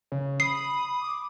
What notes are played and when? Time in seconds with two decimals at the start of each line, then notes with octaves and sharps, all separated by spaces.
0.12 C#3
0.40 B5 D#6 C7
1.00 D6